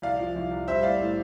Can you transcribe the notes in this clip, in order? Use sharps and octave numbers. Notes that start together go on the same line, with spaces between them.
C2 D5 F5
F3
C2
C2
G3 C5 E5
A2 D5 F5
A2